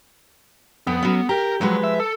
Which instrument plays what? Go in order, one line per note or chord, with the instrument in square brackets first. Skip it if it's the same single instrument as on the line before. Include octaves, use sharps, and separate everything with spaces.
[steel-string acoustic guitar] F2 [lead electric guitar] B3
[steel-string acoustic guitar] F#3 C#4
[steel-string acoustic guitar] G4 [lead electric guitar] A#4 A#5
[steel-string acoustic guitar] F3 G#3 B4 [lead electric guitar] F#3
[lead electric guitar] E5
A4